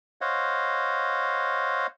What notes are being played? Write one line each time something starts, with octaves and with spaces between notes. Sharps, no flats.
C5 C#5 D#5 F5 F#5